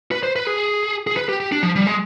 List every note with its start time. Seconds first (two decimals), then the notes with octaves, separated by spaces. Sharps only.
0.11 B4
0.23 C5
0.36 B4
0.47 G#4
1.07 G#4
1.17 B4
1.29 G4
1.40 G4
1.52 D4
1.63 F3
1.76 G3
1.87 G#3